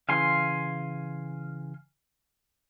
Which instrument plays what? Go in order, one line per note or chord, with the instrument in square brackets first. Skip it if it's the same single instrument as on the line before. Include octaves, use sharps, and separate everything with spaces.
[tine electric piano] C#3 E3 [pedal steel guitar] F5 G#5 C6